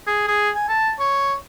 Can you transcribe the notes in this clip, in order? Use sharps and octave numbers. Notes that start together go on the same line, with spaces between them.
G#4
G#4
G#5
A5
C#5